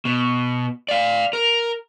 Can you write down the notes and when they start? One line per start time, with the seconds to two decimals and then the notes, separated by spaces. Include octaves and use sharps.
0.05 B2
0.89 D5 F5
1.33 A#4